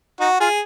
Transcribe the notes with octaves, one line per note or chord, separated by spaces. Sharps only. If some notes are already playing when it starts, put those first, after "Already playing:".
D#4 F#4
F4 G#4